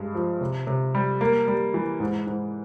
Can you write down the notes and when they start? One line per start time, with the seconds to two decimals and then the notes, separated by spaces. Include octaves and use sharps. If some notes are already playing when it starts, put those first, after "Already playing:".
Already playing: G2 G#3
0.15 F3
0.41 C3
0.67 C3
0.95 G3
1.21 A#3
1.48 G3
1.74 E3
2.00 G#2
2.27 G#2